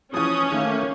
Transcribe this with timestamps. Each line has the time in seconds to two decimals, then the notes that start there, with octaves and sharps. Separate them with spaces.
0.14 E3 F3 C#4 D#6
0.52 D#3 A3 A#3